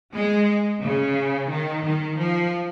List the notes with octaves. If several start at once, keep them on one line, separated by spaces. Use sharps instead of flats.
G#3
C#3
D#3
D#3
F3